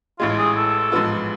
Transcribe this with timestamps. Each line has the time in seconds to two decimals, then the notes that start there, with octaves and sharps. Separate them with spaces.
0.19 A1 A2 G#3 F4
0.38 G#4
0.56 A4
0.92 A1 G#2 F3 B3 F4